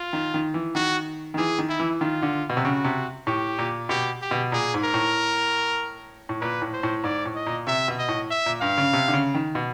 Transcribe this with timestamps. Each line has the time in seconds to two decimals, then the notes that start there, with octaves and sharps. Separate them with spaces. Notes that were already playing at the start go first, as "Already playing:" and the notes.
Already playing: F4
0.13 D#3
0.34 D#3
0.54 E3
0.75 D#3 F#4
1.34 D#3
1.38 E3 G#4
1.59 D#3
1.69 E4
1.80 E3
2.01 D#3 F4
2.22 D3
2.50 B2
2.57 C3
2.64 C#3 F#4
2.84 C3
3.27 A2 G4
3.59 A#2
3.89 B2 G4
4.22 G4
4.31 B2
4.52 A#2 G#4
4.74 G#2
4.84 A#4
4.94 A2
6.29 A2
6.41 A#2 B4
6.62 A2
6.73 C5
6.83 A2
7.04 G#2 D5
7.26 A2
7.35 D#5
7.46 A#2
7.67 C3 E5
7.88 B2
7.99 D#5
8.09 A2
8.30 E5
8.46 A#2
8.61 G2 F5
8.78 C#3
8.93 C3
9.08 D3
9.13 C#3
9.34 D#3
9.55 B2